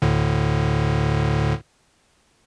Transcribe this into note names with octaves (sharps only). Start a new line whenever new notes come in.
D2 A2 D3